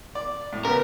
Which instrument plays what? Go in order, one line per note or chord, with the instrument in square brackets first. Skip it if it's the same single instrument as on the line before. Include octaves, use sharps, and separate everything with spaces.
[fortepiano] D5
A2
[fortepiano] C#3 B3 [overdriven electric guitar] A#4